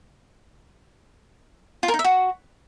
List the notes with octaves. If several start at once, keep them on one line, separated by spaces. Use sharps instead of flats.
F4
A#4
D#4
E5
F#4